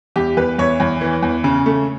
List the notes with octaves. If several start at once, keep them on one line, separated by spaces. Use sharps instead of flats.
E2 G4
E2 B4
E2 C#5
E2 C#5
E3
E2
C#3
A3